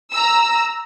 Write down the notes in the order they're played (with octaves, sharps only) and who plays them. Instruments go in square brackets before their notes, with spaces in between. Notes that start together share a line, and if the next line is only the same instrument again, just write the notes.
[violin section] A#5 E6